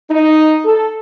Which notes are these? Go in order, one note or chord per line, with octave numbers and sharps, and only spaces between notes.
D#4
A4